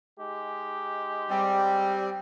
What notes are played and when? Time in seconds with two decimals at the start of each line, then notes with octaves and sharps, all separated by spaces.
0.20 G#3 D#4 G4
1.30 G3 C4